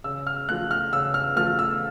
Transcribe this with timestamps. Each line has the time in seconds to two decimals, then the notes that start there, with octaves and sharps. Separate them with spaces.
0.04 C#3 E6
0.27 F6
0.49 F3 A3 F#6
0.71 F6
0.93 C#3 E6
1.14 F6
1.36 F3 A3 F6
1.59 E6